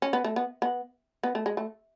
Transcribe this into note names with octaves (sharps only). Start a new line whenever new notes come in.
C#4
B3
A3
B3
B3
B3
A3
G#3
A3